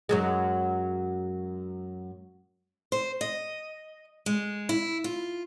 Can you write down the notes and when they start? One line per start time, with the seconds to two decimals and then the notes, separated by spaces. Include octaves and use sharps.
0.09 F#2 F#3 G#3
2.92 C5
3.21 D#5
4.26 G#3
4.69 E4
5.04 F4